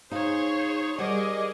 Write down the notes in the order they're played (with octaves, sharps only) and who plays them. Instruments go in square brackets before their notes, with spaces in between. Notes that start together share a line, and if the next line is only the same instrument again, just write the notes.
[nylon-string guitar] D#4 F5 [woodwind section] G#4 [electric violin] C5 C#5
[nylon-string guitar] G3 C5 F#5 [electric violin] G#4 D#5 [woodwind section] A#4 D6